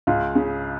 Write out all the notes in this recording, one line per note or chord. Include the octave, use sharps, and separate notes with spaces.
C#2 F4
C#3